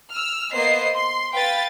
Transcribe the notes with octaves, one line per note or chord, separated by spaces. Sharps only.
E6 F6
A#3 B3 C5 D#5 C7
C6
B4 F5 G5 A6